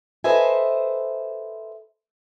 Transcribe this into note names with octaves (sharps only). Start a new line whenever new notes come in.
A4 B4 C5 D#5 E5 G#5